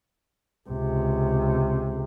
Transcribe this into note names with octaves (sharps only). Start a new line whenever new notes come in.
C#2 C3